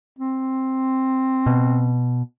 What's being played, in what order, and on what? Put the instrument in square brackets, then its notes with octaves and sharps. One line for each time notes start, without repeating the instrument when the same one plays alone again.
[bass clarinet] C4
[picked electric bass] B2